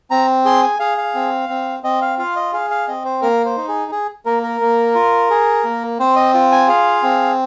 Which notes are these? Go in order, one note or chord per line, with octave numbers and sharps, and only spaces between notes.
C4 A#5
G#4 C6
G#5
G#4 F5
F5
C4
C4
C4 D#5
F5
F4 F5
D#5
G#4 F5
F5
C4 D#5
C5
A#3 A#4
C5
D#4
G#4
G#4
A#3 A#4
A#4
A#3
F4
G#4
A#3
C4 C5
D#5
F4
G#5
G#4 F5
C4